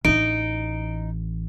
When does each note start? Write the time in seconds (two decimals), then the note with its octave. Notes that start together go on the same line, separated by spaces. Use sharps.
0.05 A1 E3 D#4 D7